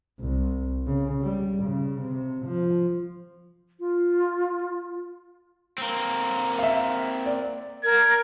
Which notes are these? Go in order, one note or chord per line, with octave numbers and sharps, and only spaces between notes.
C2
C#3
G3
C#3
C3
F3
F4
A#3 C4
E5 F5
D5
A#4 G#6